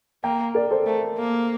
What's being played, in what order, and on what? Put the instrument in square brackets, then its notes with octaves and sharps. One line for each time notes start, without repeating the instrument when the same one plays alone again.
[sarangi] A#3 [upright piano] G5 A#5
[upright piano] A#4 D5
A4 C5
[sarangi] A3
A#3